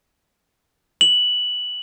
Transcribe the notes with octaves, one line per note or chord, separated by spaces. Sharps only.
F#7